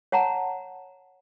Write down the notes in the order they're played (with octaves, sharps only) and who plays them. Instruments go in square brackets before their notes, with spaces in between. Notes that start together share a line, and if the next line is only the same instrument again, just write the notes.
[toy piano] C#5 F#5 A5 A#5